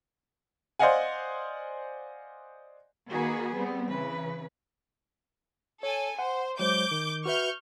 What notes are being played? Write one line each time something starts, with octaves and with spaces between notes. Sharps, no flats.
C5 D5 D#5 F5 F#5 G#5
D#3 A#3 F#4 G#4 B4
G3 B3 C4
C#3 E3 B4
A4 C#5 G#5
C5 F#5
F#3 G#3 C5 D6 G6
D#3
F#4 B4 E5 C#6 F6 G6